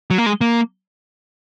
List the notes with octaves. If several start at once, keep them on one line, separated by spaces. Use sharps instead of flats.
F#3
A#3
G#3
A#3